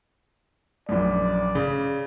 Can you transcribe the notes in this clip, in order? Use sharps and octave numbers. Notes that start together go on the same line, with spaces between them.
A#1 F#2 D5
C#3